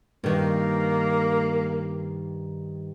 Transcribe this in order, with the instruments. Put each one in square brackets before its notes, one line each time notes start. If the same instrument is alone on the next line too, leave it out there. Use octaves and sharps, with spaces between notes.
[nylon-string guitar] G2 D#3 [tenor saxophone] A#3